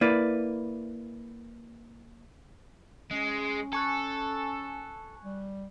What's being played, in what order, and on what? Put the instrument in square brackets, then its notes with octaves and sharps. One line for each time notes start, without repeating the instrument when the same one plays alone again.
[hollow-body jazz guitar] A#3 E4 B4 D5
[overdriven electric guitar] G#3 [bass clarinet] C#4
[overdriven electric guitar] A4 [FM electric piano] G#5 C#6 F#6
[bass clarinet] G3